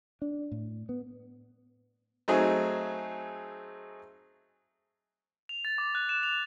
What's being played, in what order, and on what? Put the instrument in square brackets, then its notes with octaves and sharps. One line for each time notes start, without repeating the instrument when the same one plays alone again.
[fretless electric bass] D4
A2
B3
[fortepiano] F#3 A3 C4 D#4 G#4
[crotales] F7
A6
D6
F#6
E7
F7